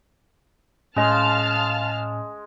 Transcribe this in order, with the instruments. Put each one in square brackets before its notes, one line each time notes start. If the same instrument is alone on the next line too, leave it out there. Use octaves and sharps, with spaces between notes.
[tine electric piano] A2 [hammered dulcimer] G#3 [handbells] C#4 D#5 C6 [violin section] F5 A5 F6